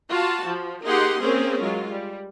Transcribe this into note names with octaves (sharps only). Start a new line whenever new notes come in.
F4 F#4 A5
F3
A#3 D#4 G4 G#4 F#5 C6
A#3 C4 C#4 G#4 A#4
F#3 G#3 F4
G3